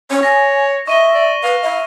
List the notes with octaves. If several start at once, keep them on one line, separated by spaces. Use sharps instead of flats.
C#4 C#5
G#5 A#6
D#5 E5 C#6 D#7 G7
D5
B4 F5
E5